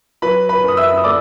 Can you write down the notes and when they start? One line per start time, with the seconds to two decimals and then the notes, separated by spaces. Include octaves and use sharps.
0.22 F#3 B4 B5
0.49 B4 B5
0.63 F#2 D#6
0.77 E5 E6
0.97 D#6
1.04 A3 D5 D6